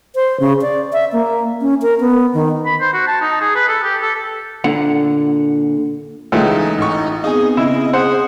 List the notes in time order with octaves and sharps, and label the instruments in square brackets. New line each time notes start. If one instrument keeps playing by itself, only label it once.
[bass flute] C5
C#3
D5
E5
A#3
C#4
A#4
B3
D#3
[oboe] B5
C5
F#4
A5
D#4
G#4
B4
A4
G4
A4
[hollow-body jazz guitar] A#2 D3 F#5
[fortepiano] C#2 A3 [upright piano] E3 F4 G#4 [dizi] D#4
[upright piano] A1 C#6 [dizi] D#4
[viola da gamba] B3 C4 [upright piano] D#4 G#5 [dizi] G#4
[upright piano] C#3 [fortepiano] E4 [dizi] D#5
[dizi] G#4 [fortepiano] C5 F#5